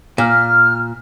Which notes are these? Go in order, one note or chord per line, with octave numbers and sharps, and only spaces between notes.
A#2 F6